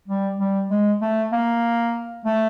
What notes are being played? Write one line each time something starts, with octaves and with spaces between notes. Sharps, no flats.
G3
G3
G#3
A3
A#3
A3